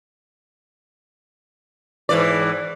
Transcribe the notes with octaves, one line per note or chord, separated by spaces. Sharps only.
G#2 E3 D5